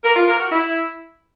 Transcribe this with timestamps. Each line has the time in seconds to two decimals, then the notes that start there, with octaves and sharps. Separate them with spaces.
0.04 A#4
0.16 F4
0.28 A#4
0.40 F#4
0.52 E4